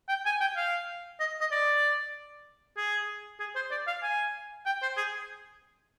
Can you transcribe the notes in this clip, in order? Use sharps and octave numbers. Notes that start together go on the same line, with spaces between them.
G5
G#5
G5
F5
D#5
D#5
D5
G#4
G#4
C5
D5
F5
G#5
G5
C5
G#4